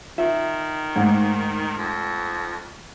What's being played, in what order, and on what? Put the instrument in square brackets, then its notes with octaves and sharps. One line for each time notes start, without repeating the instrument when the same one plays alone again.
[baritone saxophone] D#3 [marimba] F4 [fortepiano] E5
[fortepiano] G#2 [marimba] G#3 A3
[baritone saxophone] F2